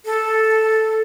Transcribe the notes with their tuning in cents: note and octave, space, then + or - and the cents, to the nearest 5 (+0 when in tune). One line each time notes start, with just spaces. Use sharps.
A4 +0